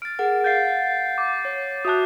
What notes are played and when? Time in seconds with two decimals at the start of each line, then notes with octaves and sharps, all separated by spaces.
0.02 F6 A6 D7
0.19 G#4 A#4 F#5
0.44 F5 F#5 G6 A6 C7
1.18 D6
1.45 C#5
1.85 F#4 E5 A5 D#6 F#6